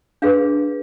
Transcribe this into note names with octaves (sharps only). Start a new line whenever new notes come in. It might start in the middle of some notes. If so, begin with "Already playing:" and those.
D4 G#4 B4 F5